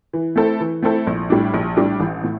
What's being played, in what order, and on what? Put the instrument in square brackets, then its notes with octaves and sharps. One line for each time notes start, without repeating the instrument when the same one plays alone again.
[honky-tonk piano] E3
A3 C4 E4 A4
E3
A3 C4 E4 A4
A#1
A2 G3 D4
A#1
A2 G3 D4
A1
A2